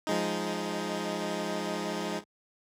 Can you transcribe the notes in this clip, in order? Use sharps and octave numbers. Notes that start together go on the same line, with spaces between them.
F3 G#3 D#4